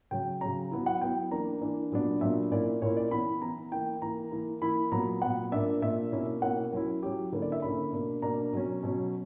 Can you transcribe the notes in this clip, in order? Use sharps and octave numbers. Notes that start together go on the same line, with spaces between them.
C#3 F#3 C#4 G5
C#3 F#3 C#4 A#5
F#3 B3 E4
F#5
F#3 B3 E4 G5
E3 A#3 D4 A#5
E3 A#3 D4
A#2 F#3 B3 D4
A#2 F#3 B3 D4 E5
A#2 A#3 C#4 E4 D5
A#2 A#3 C#4 E4 C#5
D5
E3 B3 E4 B5
E3 B3 E4 A#5
E3 A#3 E4 G5
E3 A#3 E4 A#5
E3 A#3 E4
E3 A#3 E4 B5
A#2 F#3 B3 A#5
A#2 F#3 B3 F#5
A#2 A#3 D4 E5
A#2 A#3 D4 E5
B2 A#3 C#4 E4
B2 A#3 C#4 E4 F#5
F#3 C#4 E4 A#4
F#3 C#4 E4 G4
D3 A#3 C#4 E4 B4
D5
E5
D3 A#3 C#4 E4 B5
B2 A#3 D4
B2 A#3 D4 A#5
B2 F#3 C#4
B2 F#3 C#4